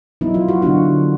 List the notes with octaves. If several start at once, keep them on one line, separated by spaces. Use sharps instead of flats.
F#3 B3 D#4 E4
F4
F#4
D3 F#3 B3 D4 F#4